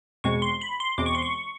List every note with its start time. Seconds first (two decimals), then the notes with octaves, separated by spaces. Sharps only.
0.24 E2 B2 G#3 C4 C#6
0.42 C6
0.61 B5
0.80 C6
0.98 E2 B2 G#3 C4 D6
1.06 C#6
1.15 C6
1.22 C#6